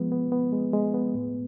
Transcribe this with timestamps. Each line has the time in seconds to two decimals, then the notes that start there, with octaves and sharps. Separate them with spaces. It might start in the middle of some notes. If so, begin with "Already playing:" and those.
Already playing: F3 G#3 B3
0.12 B3
0.32 B3
0.53 G#3
0.73 G#3
0.94 B3
1.14 A2